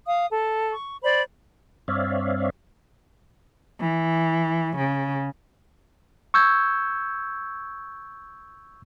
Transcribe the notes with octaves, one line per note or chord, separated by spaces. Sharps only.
F5 D#6
A4
C#6
C5 D5 B5
G2 C4 C#5 D5 E5 F5
E3
C#3
C#6 E6 G6 G#6